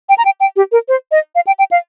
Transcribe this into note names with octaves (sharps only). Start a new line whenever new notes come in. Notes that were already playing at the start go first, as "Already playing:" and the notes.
G5
A#5
G5
G5
G4
A#4
C5
D#5
F5
G5
G5
F5